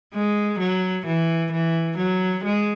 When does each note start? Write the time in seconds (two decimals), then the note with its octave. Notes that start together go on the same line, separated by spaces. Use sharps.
0.14 G#3
0.59 F#3
1.06 E3
1.52 E3
1.97 F#3
2.44 G#3